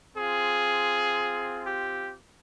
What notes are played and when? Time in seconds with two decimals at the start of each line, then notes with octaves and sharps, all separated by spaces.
0.16 C4 F4 G#4
1.67 G4